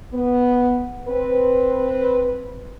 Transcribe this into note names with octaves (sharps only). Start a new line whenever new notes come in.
B3
C4 B4